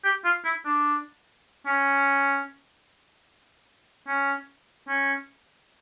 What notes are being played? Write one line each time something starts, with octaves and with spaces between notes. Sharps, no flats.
G4
F4
E4
D4
C#4
C#4
C#4